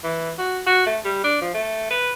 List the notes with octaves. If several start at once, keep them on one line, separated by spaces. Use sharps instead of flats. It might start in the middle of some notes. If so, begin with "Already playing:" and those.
E3
F#4
F#4
A3
G3
D4
F3
A3
B4